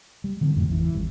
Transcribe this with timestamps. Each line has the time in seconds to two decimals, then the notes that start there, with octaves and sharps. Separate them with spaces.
0.24 G3
0.41 D3 E3 C4
0.56 F2 A2 C3
0.68 G#1 E2 G#2 E3
0.80 E3
0.94 G#1 G3